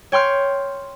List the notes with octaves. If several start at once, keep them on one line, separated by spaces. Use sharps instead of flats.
C#5 G5 C6 F6 G6